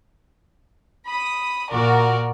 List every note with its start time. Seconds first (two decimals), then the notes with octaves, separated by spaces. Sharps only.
1.06 B5 D#6
1.71 A#2 F#4 A#4 D5